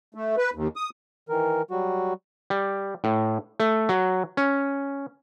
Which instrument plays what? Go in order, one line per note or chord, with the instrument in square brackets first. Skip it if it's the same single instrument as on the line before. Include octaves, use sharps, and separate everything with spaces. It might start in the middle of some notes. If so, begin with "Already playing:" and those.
[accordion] A3
B4
D#2
D#6
D#3 E3 A#4
F#3 G3 F#4
[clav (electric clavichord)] G3
A2
A3
F#3
C#4